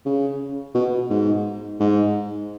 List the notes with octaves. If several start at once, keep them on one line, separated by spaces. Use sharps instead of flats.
C#3
B2
G#2
G#2